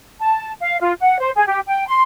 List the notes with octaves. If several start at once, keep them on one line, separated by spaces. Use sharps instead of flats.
A5
F5
F4
F#5
C5
G#4
G4
G5
C6